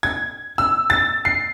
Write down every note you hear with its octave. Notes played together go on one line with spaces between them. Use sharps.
G#6
E6
A6
C7